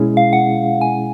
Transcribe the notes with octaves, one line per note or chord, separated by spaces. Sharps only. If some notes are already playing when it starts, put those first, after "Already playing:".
Already playing: B2 G#3 C#4 E4 G#4
F5
F#5
G#5